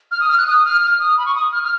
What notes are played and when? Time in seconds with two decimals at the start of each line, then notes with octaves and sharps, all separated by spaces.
0.11 F6
0.20 D#6
0.29 F6
0.38 F#6
0.47 D#6
0.65 F6
0.82 F6
1.00 D#6
1.18 B5
1.26 C#6
1.35 D#6
1.52 F6
1.63 F6